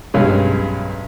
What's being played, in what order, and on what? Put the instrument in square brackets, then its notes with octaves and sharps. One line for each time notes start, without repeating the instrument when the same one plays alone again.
[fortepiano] B1 G2 G#3 C#4